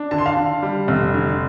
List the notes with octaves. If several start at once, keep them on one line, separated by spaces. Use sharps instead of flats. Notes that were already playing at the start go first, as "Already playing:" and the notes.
Already playing: D4
D3 A5
C6
F5 A5
D3
G3
F1
D3